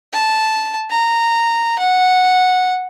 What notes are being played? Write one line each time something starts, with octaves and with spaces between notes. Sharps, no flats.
A5
A#5
F#5